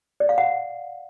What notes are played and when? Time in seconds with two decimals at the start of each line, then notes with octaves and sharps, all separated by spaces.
0.20 D5
0.29 F5
0.38 F#5